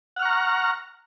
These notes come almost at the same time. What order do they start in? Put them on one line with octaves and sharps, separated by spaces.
F#5 F6 C#6 A#5